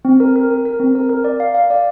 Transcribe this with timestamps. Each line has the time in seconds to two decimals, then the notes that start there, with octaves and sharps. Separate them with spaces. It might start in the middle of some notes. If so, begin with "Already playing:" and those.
0.05 C4
0.20 A#4
0.36 A#4
0.50 A#4
0.65 A#4
0.79 C4
0.95 A#4
1.09 A#4
1.24 D5
1.40 F5
1.54 F5
1.70 D5